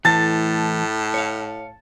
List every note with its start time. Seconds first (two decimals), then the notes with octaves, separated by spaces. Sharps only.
0.05 A2 E3 A3 A5
1.14 C#5 F5